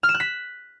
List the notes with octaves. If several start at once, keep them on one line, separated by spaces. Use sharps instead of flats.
F6
E7
F#6
B6